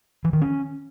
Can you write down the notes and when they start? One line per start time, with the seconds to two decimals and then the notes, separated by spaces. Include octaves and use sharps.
0.25 E3
0.33 D#3
0.41 C#4